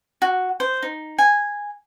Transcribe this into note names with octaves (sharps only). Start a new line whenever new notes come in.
F#4
C5
D#4
G#5